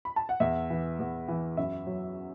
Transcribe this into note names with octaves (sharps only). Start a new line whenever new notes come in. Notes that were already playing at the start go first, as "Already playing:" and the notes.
B5
A5
F#5
E2 E5
E3
E2
E3
F#2 E5
F#3